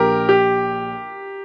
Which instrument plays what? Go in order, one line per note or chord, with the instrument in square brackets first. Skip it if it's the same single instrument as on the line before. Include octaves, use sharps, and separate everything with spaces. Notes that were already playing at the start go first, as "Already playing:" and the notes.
Already playing: [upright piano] A#1 [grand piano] G4 A#4
[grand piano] G4